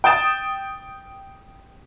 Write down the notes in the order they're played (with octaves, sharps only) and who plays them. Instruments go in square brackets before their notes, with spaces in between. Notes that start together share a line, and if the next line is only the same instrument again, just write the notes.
[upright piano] G5 D#6 A6 E7